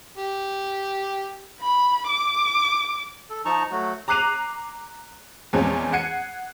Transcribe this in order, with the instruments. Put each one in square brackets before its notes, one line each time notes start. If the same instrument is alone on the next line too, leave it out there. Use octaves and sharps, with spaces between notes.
[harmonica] G4
[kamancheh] B5
D6
[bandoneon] A4
F3 D#4 A5 A#5 C#6
F#3 A3 F#4
[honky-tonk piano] A#5 D6 F#6 C7 D#7 F7
E2 A#2 F3 G#3 C4 C#4
F#5 G#6 C7 C#7 D#7